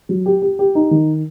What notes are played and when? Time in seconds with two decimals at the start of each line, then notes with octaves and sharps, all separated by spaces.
0.09 F#3
0.26 G4
0.42 G4
0.59 G4
0.75 D#4
0.91 D#3